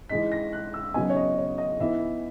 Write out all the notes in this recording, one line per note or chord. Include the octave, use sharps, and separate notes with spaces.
E3 G#3 D#4 B6
A#6
F#6
E6
C#3 F#3 B3 D#4 G#5
C#5
D#5
C#5
D#5
E3 B3 D#4 E5